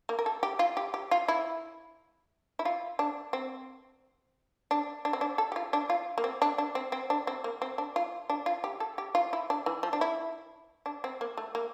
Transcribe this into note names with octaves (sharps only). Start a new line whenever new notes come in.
A#3
A#4
A4
G4
F4
G4
G4
F4
E4
E4
F4
D4
C4
D4
D4
C4
D4
A4
G4
F4
D4
F4
A#3
C4
D4
D4
C4
C4
D4
C4
A#3
C4
D4
F4
D4
F4
G4
A4
G4
F4
E4
D4
E3
F3
D4
E4
D4
C4
A#3
A3
A#3